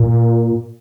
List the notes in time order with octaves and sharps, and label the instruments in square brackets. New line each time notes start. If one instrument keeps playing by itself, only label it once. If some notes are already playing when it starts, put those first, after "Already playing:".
Already playing: [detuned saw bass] A#2